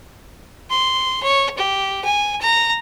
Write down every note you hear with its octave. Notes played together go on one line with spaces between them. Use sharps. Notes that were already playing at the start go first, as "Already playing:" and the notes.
C6
C#5
G4
G#5
A#5